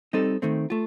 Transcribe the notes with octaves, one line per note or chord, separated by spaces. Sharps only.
G3 C4 D#4 A4 D#5
D#3 A3 C4
A3 F4